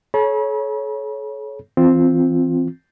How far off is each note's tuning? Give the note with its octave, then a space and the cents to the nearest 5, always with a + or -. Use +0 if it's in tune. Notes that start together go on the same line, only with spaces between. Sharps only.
A4 -45 C#5 +0 B5 -40
E3 +0 C4 +0 F4 +0